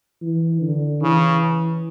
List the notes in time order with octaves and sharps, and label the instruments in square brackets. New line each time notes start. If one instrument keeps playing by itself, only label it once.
[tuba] E3
D3
[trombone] C#3 [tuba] E3